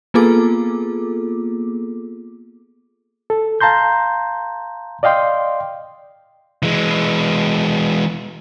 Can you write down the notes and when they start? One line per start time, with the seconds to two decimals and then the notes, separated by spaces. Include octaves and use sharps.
0.14 A#3 B3 F4 G#4 A4 D6
3.30 A4
3.61 F5 A5 A#5 C6 G6
5.03 D5 D#5 F5 G5 C6
6.63 E3 G#3